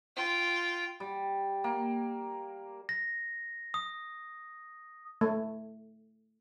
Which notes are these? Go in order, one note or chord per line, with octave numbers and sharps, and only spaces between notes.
F4 G5
G3
A#3
A#6
D#6
A3